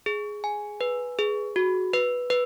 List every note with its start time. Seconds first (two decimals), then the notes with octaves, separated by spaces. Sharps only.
0.06 G#4
0.44 G#5
0.81 B4
1.19 G#4
1.56 F#4
1.93 B4
2.30 B4